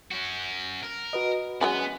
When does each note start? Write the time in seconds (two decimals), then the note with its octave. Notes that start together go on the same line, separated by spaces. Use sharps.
0.11 C#4 F#4
0.83 A#4
1.13 F#4 B4 D#5
1.61 F#3 G#3 B3 C#4